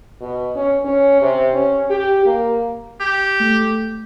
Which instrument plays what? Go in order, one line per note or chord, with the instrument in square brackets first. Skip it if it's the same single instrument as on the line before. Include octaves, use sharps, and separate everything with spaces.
[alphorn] B2
C#4
C#4
C3
C#4
G4
A#3
[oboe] G4
[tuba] A3